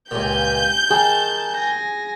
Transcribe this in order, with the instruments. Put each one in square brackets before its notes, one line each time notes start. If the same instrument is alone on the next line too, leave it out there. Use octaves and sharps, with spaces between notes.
[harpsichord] C#2 A#2 [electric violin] G4 G#5 [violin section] G6
[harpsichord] D#3 [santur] G#4 [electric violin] A5
[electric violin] G#5 A#6